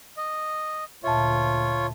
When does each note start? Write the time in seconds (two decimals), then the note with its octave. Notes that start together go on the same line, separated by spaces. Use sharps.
0.17 D#5
1.04 D2 A#2 F4 C#5 E5 A5